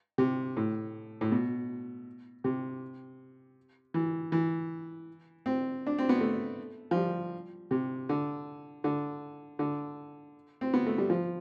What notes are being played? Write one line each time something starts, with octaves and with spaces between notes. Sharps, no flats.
C3
A2
A2
B2
C3
E3
E3
C4
D4
C4
B3
A3
F3
G3
C3
D3
D3
D3
C4
B3
A3
G3
F3